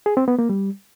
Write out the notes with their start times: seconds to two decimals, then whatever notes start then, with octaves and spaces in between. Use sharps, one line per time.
0.06 G#4
0.17 C4
0.28 B3
0.39 A#3
0.49 G3